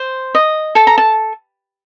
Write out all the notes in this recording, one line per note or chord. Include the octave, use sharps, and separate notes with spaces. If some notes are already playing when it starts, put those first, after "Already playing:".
Already playing: C5
D#5
A4 A5
A#5
A5